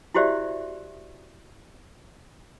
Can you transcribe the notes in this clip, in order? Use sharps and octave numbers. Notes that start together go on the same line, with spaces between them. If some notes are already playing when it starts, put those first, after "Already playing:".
E4 F#4 G4 C5 D5 E5